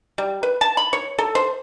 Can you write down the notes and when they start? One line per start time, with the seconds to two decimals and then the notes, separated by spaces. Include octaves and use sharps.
0.18 G3
0.43 B4
0.61 A5
0.77 B5
0.93 C#5
1.19 A4
1.35 C5